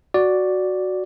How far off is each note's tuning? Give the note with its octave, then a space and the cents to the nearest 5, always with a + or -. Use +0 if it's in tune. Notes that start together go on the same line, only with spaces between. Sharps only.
F#4 +0 D5 +0